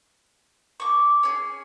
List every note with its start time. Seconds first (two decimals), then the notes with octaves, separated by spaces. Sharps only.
0.80 C#6 D6
1.23 C#4 G#4